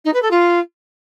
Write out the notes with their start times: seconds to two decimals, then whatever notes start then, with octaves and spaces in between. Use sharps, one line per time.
0.04 D#4
0.13 B4
0.22 A4
0.30 F4